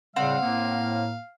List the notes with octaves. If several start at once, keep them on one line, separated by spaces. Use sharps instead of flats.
A2 C#3 G3 C4 F5 F#5
A2 A#3